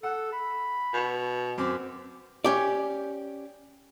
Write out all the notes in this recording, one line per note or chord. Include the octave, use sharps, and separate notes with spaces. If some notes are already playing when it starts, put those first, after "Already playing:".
A4 F#5
B5
B2
F#2 C4 D6
C#4 G4 D5